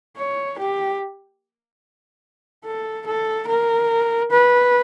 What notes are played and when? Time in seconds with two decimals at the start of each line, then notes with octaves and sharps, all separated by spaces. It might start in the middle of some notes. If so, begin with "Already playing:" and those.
0.17 C#5
0.58 G4
2.65 A4
3.07 A4
3.47 A#4
4.31 B4